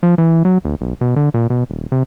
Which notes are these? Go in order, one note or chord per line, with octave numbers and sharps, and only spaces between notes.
F3
E3
F#3
D2
B1
B2
D3
A#2
B2
D#1
C3